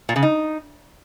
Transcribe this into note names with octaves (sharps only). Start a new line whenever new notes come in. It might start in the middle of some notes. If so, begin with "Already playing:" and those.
A#2
C#3
D#4